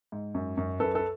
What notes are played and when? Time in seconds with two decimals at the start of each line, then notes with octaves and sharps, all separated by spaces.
0.12 G#2
0.34 F#2
0.57 F#2
0.80 F#2 A4 B4
0.95 A4 B4